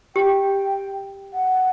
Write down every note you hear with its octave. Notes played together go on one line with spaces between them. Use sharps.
G4 G5
F#5